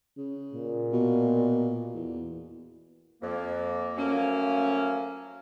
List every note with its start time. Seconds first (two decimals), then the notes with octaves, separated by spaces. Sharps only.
0.17 C#3
0.54 A#2
0.93 B2
1.95 E2
3.22 F2 A#3
3.98 F3 F#3 A3 A#3 C#4